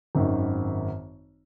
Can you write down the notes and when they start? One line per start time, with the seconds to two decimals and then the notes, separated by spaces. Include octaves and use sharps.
0.15 G#1 F#2 D#3